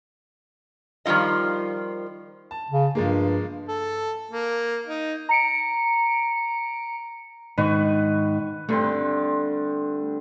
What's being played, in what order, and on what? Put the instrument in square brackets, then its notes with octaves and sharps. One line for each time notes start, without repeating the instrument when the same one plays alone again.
[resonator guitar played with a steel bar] D#3 F3 G3 F4 D#5
[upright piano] A5
[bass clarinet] C#3
[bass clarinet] G2 [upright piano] F3 G#3 A#3
[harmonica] A4
A#3
D#4
[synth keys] A#5 C#7 D7
[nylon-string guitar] G#2 D#3 [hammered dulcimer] B4 C#6
[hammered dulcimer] G2 D3 C4 [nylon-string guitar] A3